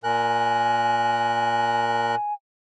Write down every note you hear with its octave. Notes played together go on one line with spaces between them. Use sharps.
A#2 A#4 G#5 F#6